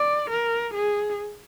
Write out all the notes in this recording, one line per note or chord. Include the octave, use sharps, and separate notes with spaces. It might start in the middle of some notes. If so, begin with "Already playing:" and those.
Already playing: D5
A#4
G#4